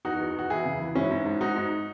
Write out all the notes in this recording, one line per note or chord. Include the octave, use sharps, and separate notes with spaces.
E2 D#4 F#4
E2
E2 F#4
E2 E4 G#4
C#3
E3
G#2 C#4 E4
G#2
G#2
G#2 D#4 F#4
G#2